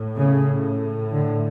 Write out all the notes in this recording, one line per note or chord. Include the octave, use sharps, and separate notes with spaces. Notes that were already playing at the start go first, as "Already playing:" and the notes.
Already playing: A2
C#3
D3